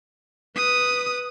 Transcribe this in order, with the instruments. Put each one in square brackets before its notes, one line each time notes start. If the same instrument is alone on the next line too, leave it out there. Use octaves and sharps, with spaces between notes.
[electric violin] B4 D#6